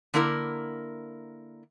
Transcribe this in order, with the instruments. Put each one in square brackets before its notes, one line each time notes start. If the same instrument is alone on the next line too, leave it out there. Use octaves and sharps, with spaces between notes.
[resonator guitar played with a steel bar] D3 A#3 E4 A#4